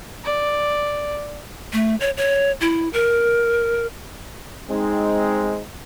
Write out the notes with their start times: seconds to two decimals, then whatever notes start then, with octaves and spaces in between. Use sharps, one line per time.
0.24 D5
1.73 A3
2.00 C#5
2.17 C#5
2.61 E4
2.93 A#4
4.70 G#3 C4 D#4